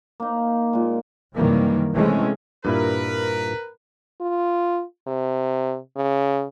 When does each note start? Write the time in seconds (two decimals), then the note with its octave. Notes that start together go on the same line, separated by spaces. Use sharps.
0.20 A#3 D#4
0.73 A#2 G#3
1.36 F#2 C3 D#3 E3 G3 A#3
1.95 C3 E3 G#3 A3 C4 C#4
2.65 G2 A#2 E4 A#4 B4
4.21 F4
5.07 C3
5.96 C#3